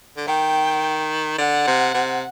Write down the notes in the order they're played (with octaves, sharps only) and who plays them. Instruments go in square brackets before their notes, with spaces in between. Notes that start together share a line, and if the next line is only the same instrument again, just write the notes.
[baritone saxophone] D3
[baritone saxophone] D#3 [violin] G5
[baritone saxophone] D3 [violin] F#5
[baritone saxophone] C3
C3